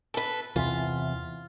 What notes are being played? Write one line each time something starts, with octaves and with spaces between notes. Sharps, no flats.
A4 B4
E2 C3 E3 F4